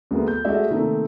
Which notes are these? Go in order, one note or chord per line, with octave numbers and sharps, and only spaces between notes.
D2 G#3 A#3 B3
G6
G#3 A3 F#4 D5 E5
C3 D#3 A3 A#3 C4 D#4